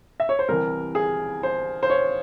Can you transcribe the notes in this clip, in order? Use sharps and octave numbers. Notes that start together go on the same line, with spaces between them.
E5
C#5
C5
C2 C3 E3 A#4
G#4
C5
C5
C#5